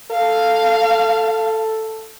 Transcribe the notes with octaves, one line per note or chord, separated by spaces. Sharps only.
A4 F5